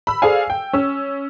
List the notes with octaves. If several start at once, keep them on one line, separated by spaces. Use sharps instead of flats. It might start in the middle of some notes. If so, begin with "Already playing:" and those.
B5 E6
G#4 A4 C5 D5 F5 G#5
G5
C#4 E6